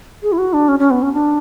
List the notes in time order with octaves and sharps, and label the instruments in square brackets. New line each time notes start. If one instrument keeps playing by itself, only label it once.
[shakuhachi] G#4
E4
F#4
D4
C#4
C#4
B3
C#4
D4